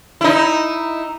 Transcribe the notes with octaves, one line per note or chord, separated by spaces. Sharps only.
D#4 E4